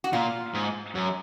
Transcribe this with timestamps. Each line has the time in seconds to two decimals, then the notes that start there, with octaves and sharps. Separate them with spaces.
0.04 F#4
0.13 A#2 F4
0.54 G#2
0.95 F#2